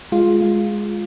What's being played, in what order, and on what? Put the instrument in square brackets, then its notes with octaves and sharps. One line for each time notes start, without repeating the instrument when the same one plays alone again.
[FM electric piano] G#3 F4
G#3